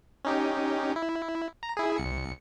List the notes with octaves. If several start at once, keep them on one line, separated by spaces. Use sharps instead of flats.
C#4 D#4 G4
E4
A#5
E4 G#4
C2 C#7